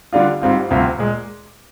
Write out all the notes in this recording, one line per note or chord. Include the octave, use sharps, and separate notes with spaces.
D3 G3 D4 F4
G#2 G3 C4 F4
D2 C3 G3 C4 F4
A#2 G#3